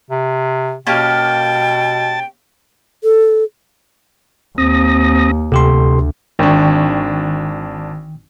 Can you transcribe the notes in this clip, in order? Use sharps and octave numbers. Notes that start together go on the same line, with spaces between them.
C3
B2 A#3 C#4 G4 G5 A5
A4
D#2 C4 D#6 A#6
D2 C3 G4 A4 C6
G#1 D#3 D4 G5 C#6